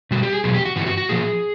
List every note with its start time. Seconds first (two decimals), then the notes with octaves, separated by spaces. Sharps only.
0.11 B2 G3 F#4
0.23 G4
0.33 G#4
0.44 E2 B2 F#3 G#4
0.54 G4
0.65 F#4
0.76 G2 E3 G3 F#4
0.87 F#4
0.98 F#4
1.09 A#2 F3 G#4